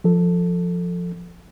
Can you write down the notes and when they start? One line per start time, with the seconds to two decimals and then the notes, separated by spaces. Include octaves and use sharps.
0.04 F3 A4